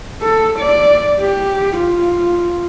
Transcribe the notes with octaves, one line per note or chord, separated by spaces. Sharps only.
A4
D5
G4
F4